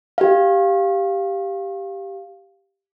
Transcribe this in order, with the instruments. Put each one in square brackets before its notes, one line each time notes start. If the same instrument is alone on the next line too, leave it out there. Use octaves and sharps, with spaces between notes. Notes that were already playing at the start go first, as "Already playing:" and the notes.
[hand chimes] G4 F5